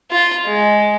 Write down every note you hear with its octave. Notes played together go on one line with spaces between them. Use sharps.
F4
G#3